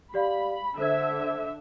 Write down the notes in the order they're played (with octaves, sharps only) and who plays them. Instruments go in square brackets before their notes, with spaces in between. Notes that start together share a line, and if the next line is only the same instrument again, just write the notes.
[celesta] G4 D5 F5 [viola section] B5
[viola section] D3 E5 [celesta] A4 C5 G#6